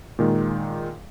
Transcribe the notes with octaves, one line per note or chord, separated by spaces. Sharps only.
A#2 D#3 G#3